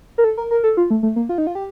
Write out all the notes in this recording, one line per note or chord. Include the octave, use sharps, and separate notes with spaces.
A#4
A4
A#4
A#4
A4
F4
A3
A3
A#3
F4
D#4
F4
G4